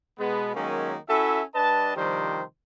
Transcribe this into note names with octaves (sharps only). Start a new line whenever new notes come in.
B2 G#3 B3
D#3 F#3 G#3 A#3 C#4
C#4 E4 F#4 A4 E5
G3 D4 B4 D#5 A5
C3 D#3 F3 G3 D4 C5